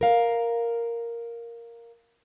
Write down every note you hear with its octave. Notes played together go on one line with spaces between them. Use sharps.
A#4 F5